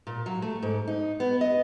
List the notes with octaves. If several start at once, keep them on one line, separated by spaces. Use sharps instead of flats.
A#2
F#3
A3
G#2
D#4
B3
D#5